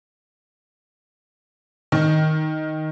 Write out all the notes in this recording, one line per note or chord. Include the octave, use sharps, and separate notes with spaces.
D#3